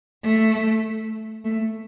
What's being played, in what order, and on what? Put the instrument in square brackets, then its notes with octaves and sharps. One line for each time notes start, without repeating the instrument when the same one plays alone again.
[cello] A3
A3